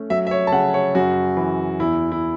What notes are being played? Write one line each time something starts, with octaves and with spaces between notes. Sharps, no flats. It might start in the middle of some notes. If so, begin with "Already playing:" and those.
Already playing: A3 C#4
F#3 E5
E5
C#5
A5
C#3 F#5
C#5
F#2 F#4
E3
E2 E4
E4